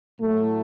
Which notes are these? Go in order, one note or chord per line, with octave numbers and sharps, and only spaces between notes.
A2 F#3 A3